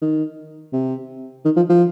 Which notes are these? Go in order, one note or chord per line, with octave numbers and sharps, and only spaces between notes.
D#3
C3
D#3
F3
F3